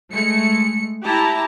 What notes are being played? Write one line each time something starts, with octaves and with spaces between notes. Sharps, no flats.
G#3 A3 C#7
E4 G4 A5 A#5